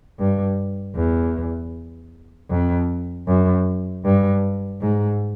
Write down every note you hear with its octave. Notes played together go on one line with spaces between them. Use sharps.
G2
E2
F2
F#2
G2
G#2